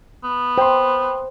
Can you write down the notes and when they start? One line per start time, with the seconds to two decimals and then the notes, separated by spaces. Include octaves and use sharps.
0.24 B3
0.58 C5 G5 C6